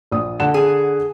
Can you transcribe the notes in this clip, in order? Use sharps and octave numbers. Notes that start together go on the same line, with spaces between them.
A#1 D#6
D3 F#5 E7
G#4